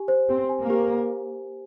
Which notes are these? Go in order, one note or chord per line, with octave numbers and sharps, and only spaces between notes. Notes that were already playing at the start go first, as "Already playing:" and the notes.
Already playing: G4 G#5
C5
C4 G4
G#5
A#3
G4